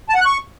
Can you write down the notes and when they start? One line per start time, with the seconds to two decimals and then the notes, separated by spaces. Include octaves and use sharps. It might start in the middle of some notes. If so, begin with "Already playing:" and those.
0.09 A5
0.14 F#5
0.20 F#6
0.25 C#6